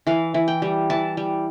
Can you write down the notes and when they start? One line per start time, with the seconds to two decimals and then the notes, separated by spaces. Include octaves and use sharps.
0.07 E3 F5
0.34 E3
0.48 G5
0.62 G3
0.90 E3 A5
1.17 G3